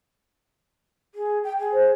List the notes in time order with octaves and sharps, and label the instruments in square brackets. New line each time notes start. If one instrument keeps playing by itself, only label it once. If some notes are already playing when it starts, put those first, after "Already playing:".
[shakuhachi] G#4
G5
G#4
[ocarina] C5